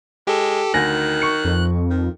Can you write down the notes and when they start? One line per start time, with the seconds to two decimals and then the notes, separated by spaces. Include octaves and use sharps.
0.27 G#3 G4 A4
0.74 D2 D#3 G#5 F#6 A#6
1.22 C#6 C#7
1.45 F2
1.90 D#3